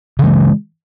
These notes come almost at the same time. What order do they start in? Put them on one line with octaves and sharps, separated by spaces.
C#3 E3 G#3